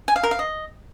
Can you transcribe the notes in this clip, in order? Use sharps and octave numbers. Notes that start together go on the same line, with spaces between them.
G#5
F5
A#4
F5
D#5